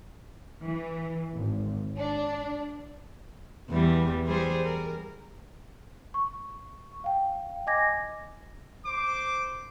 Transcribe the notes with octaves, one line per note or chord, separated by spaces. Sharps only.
E3
G#1
D4
E2 E3 G3
G3 G#4 C5
A#4
C#6
F5 G5
D#5 G#5 D6 G#6 A#6
C5 D6